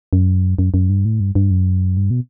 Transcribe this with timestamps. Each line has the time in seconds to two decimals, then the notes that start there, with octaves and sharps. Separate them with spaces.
0.13 F#2
0.59 F#2
0.74 F#2
0.90 G2
1.05 A2
1.20 G2
1.35 G2
1.51 F#2
1.97 G2
2.11 B2